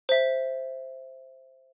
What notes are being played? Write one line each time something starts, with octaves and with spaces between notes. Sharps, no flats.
C5 E5